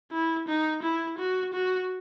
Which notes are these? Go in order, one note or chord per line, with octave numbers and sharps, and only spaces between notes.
E4
D#4
E4
F#4
F#4